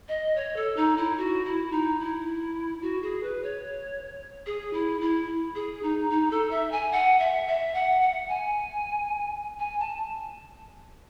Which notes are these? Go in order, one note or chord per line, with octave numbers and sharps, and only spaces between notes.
D#5
C#5
A4
D#4
E4
F#4
E4
D#4
E4
F#4
G#4
B4
C#5
G#4
E4
E4
G#4
D#4
D#4
A4
E5
G#5
F#5
E5
E5
F#5
F#5
G#5
G#5
A5